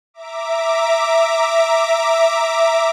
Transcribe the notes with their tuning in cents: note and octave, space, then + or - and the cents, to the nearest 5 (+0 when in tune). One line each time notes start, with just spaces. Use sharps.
E5 +0 A#5 +0 D6 +0